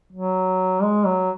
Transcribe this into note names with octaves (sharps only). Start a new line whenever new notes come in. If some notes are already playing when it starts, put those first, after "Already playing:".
F#3
G#3
F#3